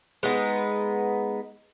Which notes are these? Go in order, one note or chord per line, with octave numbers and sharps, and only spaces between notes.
G#3 B3 D#4